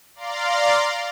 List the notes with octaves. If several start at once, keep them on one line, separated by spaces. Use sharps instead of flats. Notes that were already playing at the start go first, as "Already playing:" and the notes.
D5 F5 A#5 C6